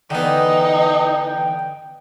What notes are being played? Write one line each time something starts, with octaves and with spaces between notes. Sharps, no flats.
D3 E3 B3 D#4 G5